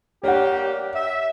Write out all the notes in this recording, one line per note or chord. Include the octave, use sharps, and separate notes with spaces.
G3 A#3 G4 C#5 F#5
E5